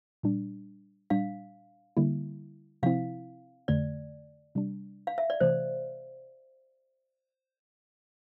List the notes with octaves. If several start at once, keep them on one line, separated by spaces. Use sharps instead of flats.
A#2 G3 D4
A#2 G3 D4 F5
D3 G3 A#3 E4
C3 F3 C4 E4 F5
F2 D3 A3 D5
C3 G3 D4
F5
E5
D5
C3 E3 A3 C5